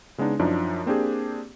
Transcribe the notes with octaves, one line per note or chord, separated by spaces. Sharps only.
C#3 G#3 B3 D4 D#4
F#2 F3 D4 D#4
A#3 C4 D4 G4 G#4